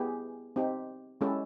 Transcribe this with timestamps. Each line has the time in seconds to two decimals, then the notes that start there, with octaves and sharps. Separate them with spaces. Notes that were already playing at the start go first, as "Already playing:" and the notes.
Already playing: B3 E4 G4 G#4
0.56 C4 D#4 G4
1.21 G#3 C#4 E4 G4 A4